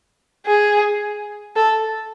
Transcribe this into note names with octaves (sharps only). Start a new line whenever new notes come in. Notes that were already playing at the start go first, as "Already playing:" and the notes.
G#4
A4